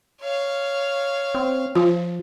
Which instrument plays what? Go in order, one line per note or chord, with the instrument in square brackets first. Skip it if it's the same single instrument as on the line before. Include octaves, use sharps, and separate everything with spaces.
[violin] C#5 F5
[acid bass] C4
[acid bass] F3 [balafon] F4